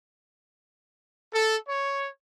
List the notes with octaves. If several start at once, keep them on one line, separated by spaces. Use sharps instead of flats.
A4
C#5